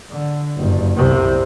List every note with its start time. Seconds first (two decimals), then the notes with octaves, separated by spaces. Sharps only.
0.10 D3
0.57 F#1 G2
0.97 C2 C3